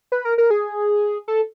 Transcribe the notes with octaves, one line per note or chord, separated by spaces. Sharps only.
B4
A#4
A#4
G#4
A4